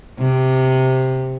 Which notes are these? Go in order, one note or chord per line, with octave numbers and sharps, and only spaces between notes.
C3